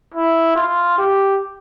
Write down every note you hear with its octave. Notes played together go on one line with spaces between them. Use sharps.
E4
F4
G4